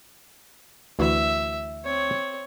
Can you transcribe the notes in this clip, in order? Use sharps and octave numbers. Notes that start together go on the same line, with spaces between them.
D2 E3 F#4 E5
C4 C#5